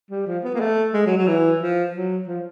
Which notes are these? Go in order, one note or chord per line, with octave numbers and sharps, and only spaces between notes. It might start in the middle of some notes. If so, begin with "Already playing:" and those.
G3
F3
B3
A#3
A3
G#3
F#3
F#3
E3
F3
F#3
F3